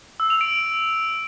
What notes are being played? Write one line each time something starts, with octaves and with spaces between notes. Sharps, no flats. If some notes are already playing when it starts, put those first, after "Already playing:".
E6
F7
D7